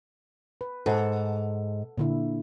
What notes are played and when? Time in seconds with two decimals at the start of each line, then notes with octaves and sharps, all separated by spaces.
0.61 B4
0.86 G#2 A4 F#5
1.98 A#2 D3 E4